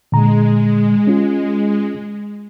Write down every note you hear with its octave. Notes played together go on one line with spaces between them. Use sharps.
A#2 D3 G#3 A#5
C#4 F4